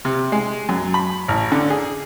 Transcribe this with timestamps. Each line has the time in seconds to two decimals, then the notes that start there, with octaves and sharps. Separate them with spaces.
0.05 C3
0.32 G#3
0.69 F#2
0.94 B5
1.28 A1
1.52 D3
1.70 G#4